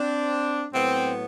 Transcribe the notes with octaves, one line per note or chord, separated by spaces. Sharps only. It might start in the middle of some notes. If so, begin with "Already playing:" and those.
Already playing: C4 D4
A2 F#3 B3 C4